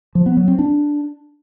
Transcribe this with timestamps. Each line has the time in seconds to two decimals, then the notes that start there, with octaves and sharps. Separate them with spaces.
0.15 F3
0.26 B3
0.37 F#3
0.48 C4
0.59 D4